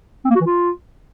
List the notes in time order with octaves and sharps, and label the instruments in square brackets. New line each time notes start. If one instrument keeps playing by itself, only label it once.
[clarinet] C4
A#3
F#4
E3
F4